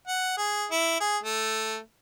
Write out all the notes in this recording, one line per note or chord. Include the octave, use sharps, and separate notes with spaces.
F#5
G#4
E4
G#4
A3